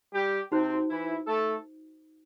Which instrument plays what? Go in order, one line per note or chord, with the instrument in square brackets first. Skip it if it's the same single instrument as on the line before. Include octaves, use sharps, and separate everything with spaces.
[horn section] G3 G4
[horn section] C3 C4 [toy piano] D#4 F#4 C5
[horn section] E3 E4
A3 A4